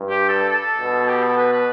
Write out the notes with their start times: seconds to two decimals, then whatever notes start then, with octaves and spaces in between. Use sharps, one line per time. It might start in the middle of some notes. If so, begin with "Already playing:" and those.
Already playing: G2
0.10 G4
0.29 A4
0.49 A4
0.78 B2
1.08 G4
1.23 A4
1.37 B4
1.53 B4